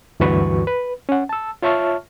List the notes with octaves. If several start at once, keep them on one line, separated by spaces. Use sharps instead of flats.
D2 G2 E3 F#4 B4 C#6
B4
C#4 F#5
A5 E6
F4 C#5 E5 A5 C#6 F6